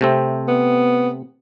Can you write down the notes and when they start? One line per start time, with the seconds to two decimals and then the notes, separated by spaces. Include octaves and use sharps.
0.01 C3 A3 C4
0.48 B3